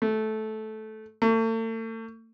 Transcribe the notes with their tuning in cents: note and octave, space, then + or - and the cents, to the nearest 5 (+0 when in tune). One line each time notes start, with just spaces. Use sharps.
A3 -15
A3 +40